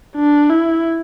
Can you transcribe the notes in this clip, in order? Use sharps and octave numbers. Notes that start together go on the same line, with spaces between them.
D4
E4